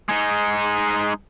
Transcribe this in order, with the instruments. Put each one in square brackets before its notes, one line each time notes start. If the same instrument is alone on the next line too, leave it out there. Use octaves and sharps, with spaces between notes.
[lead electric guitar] G#3 D#4